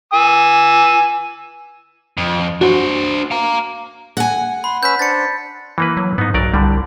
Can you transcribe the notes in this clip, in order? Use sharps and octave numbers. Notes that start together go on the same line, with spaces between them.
G#5 E6
F2
D4 F#4 C5
F5 A#5
F#5 G#5
B5 C6
C#4 B4 E6 G6 B6
D4 C5 A6 C#7
E3 A#3 B4
F#3
G#2 B3 D#4
B1 F#3 A#4 D5
C2 D3 G3